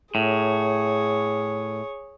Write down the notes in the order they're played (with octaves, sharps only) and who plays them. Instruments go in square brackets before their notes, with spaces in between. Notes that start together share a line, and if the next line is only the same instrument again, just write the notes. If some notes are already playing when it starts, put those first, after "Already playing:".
[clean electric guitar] A2 [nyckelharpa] G#4 C#5